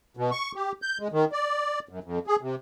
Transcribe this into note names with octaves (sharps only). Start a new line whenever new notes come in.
B2
C#6
G4
G6
G#3
D#3
D5
F#2
F2
G#4
C3